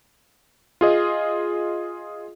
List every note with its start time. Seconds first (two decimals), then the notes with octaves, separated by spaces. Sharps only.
0.81 F4 G#4 D#5